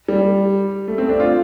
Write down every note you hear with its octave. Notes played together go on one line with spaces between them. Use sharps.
G3
A3
C4
D4
F4